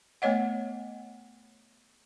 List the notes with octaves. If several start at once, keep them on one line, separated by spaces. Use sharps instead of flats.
A3 B3 C#5 D#5 F#5